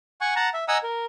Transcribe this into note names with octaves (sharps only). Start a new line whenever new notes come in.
F#5 G#5 C#6
F#5 A5 A#5
E5
D#5 F#5 G#5 A#5 D#6 E6
A#4